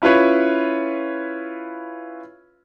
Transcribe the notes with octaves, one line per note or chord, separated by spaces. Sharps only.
C#4 E4 F4 B4 C#5